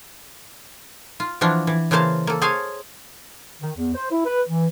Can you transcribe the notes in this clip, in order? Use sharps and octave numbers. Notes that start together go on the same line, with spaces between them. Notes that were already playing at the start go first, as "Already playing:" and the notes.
F4
E3 F3 D4 F4 F#4
E3
C#3 E3 A#3 C5 F5 A5
A#3 A4
G#4 C5 C#5 F5 G#5 A5
D#3
E2
C5
E4
B4
E3